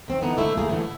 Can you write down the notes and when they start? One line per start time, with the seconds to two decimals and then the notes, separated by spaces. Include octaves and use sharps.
0.08 D#3 C4
0.21 D3 E3 B3 D#4
0.37 G#2 D3 A3 E4
0.57 A3 A#3 F4 G#4
0.69 A2 D3 E3 A3
0.81 E4